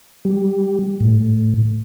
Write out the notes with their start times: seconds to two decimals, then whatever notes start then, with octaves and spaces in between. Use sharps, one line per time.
0.25 G3
1.00 A2